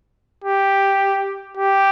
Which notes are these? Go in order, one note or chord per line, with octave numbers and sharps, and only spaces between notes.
G4
G4